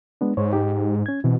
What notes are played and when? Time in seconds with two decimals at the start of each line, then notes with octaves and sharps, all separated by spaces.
0.21 G#3 B3 D4
0.37 G#2 C5 C#5
0.53 D#4 G4
1.06 C#4 G#6
1.24 B2 E3 C4